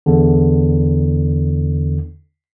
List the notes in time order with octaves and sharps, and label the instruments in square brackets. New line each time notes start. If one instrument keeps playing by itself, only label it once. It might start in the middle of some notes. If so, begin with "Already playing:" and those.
[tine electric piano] E2 D3